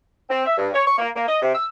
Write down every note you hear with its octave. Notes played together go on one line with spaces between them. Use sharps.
C4
E5
G2
C#5
C#6
A#3
A#3
D#5
C3
E6